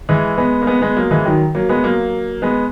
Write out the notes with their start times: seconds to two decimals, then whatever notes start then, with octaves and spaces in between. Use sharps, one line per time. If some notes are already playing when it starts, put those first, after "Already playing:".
0.09 E3 G#3
0.38 G#3 B3
0.62 A#3
0.67 G#3 B3
0.81 G#3 B3
0.96 F#3 A#3
1.11 E3 G#3
1.25 D#3 F#3
1.55 F#3 A#3
1.69 G#3 B3
1.84 F#3 A#3
2.42 G#3 B3